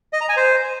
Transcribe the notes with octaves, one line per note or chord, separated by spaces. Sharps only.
D#5
A#5
G#5
C5